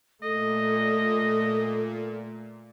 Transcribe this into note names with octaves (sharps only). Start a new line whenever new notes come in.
A#2 A3 A4 D#5